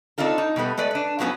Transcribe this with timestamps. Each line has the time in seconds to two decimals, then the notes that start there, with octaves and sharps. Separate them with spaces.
0.18 C4 D4 D#4 F4 A4
0.38 D#4
0.56 B2 G3 A3 B3
0.77 G#3 A3 B4 D5
0.91 D4 B4
1.19 G2 F3 F#3 B3 C#4